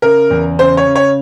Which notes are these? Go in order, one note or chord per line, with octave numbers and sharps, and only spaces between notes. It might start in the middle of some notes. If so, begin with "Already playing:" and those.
C#3 A#4
E2
C#3 C5
C#5
C#3
C#5